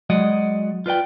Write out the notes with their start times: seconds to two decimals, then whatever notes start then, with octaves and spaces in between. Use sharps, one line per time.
0.10 F#3 G#3 F#4 D5 D#5
0.86 F4 B4 D5 G5